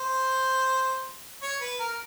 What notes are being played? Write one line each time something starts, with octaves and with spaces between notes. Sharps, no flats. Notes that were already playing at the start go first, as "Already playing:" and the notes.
Already playing: C5
C#5
B4
A#4